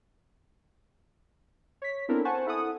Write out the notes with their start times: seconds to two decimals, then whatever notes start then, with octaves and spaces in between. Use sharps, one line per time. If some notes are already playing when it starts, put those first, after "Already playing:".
1.82 C#5 B6
2.08 B3 C4 D4 E4 A4 A#4
2.25 C5 F#5 G#5 A5 C#6
2.47 E4 A4 F#5 D#6